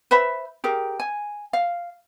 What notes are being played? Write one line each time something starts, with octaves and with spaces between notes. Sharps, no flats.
B4 C5 E5 B5
G4 G#4 A#4
G#5
F5